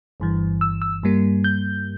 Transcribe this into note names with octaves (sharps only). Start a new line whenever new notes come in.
G1 G2 E3
E6
E6
G2 G3 A#3
G6